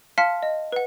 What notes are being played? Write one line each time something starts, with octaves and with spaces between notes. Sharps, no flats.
F5 A5 C6 F6 B6 C#7
D#5
B4 F#5